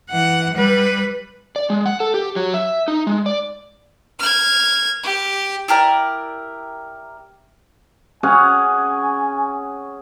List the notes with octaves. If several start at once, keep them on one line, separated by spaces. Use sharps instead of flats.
E3 F#5
G3 B4
D5
G#3
F#5
A4
G4
F#3
E5
D#4
G#3
D5
F6 G#6
G4
E4 G4 A#4 D5
C#4 G#4 F#5 G#5